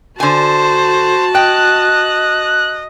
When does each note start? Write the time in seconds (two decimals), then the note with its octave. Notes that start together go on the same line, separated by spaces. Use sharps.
0.20 D3 F#4 C5 G#5 A5
1.35 D#5 G5 F#6